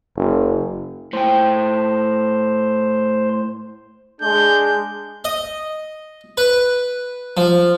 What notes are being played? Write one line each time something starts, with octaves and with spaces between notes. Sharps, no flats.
F#1
A2 C5 G5
G#3 D4 G#4 G6
D#5
B4
F3